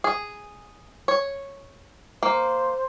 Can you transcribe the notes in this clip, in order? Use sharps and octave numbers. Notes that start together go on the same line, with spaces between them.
G#4
C#5
A#3 C5